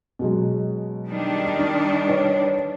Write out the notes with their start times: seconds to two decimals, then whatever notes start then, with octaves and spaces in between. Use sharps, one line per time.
0.19 B2 F#3 G#3
1.08 D#3 G3 D4
1.59 D#4
2.08 B4 C#5